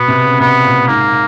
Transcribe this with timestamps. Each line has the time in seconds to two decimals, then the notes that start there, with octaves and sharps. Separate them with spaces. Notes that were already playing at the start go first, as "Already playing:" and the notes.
Already playing: B2 B3
0.08 C3
0.24 C#3
0.40 C3 B3
0.64 A#2
0.88 G#2 A#3